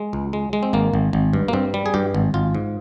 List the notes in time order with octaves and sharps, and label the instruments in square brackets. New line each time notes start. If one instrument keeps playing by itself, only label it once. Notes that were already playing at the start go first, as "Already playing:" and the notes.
Already playing: [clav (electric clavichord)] G#3
C#2
G#3
G#3
C4
G#1 A#3
G#1
G#1
G2
A#3
G2 C4
G3
G#4
G2 G4
G#1
G#1 F4
G#2